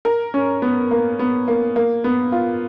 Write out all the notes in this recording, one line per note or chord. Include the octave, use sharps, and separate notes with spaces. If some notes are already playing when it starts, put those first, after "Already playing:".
A#4
C#4
B3
A#3
B3
A#3
A#3
B3
F4